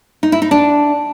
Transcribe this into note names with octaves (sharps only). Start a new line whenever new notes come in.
D#4
E4
D#4
D4